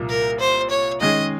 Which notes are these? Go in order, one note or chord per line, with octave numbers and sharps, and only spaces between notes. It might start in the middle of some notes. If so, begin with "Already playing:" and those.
Already playing: C2 A#2 F3 A#3
A#4
C5
C#5
D#3 G#3 C#4 G#4 D#5